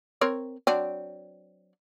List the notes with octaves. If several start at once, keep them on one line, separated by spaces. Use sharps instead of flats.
C4 A#4 C#5
F#3 C4 D4